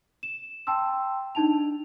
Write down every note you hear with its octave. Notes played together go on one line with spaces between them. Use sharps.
E7
G5 A5 C6 E6
D4 D#4 A5 F7